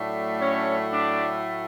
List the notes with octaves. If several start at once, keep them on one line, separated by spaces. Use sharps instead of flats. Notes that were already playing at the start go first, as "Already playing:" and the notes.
Already playing: A2 F#3 A3 D4
C#4 C#5
D4 D5